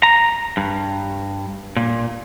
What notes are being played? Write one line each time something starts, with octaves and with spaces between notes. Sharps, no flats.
A#5
G2
A#2